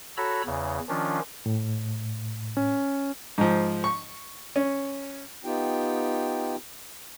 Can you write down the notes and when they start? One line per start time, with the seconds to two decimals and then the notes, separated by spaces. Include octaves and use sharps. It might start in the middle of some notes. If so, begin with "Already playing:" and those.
0.17 F#4 A4 C#5 A#5 B5 E6
0.46 E2 C#3
0.89 D#3 F3 C#4 D4 F4
1.46 A2
2.57 C#4
3.38 G#2 F3
3.84 C#6
4.56 C#4
5.45 B3 D#4 F4 G4 G5